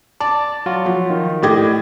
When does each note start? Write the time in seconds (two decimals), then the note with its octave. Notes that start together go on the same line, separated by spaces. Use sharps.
0.20 D5 A5
0.66 F#3 F4 F#4
0.86 F3
1.10 D#3
1.42 A2 G4 D5 D#5 G#6